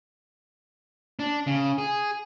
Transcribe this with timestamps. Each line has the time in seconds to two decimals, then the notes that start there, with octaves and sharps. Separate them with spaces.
1.19 D4
1.47 C#3
1.78 G#4